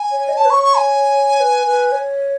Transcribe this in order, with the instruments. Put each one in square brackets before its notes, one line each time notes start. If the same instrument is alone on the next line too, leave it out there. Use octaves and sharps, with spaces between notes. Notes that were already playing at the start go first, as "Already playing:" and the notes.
Already playing: [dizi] G#5
[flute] C#5
D#5
[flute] C#5 [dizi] A5
[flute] B4
[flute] C#5 [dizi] C#6
[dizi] C#6
G#5
[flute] B4
B4
C#5